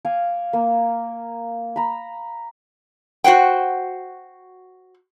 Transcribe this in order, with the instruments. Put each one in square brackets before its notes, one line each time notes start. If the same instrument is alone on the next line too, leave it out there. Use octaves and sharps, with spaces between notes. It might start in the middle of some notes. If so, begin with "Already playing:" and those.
[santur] F5 G#5 D6
A#3
A#5 B5
[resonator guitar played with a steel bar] F#4 C5 F#5 G5